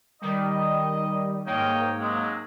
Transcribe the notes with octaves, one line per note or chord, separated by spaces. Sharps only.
D#3 G3 D#5
G#2 A#3 C#5 D#5 G5
C3 F#3 G#3